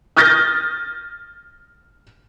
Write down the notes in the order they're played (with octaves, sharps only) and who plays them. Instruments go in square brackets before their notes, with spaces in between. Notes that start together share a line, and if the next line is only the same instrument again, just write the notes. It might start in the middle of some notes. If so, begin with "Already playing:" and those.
[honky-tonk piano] D#6 F6 G6 A6 A#6